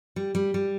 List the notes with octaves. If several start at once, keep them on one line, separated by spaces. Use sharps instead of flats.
G3
G3
G3